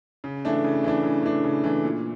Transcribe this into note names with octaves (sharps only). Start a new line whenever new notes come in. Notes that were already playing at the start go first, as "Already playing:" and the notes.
C#3
E3 A3 D4
C#3
E3 A3 D4
C#3
E3 A3 D4
C#3
E3 A3 D4
A#2